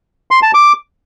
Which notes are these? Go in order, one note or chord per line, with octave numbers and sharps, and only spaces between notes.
C6
A5
D6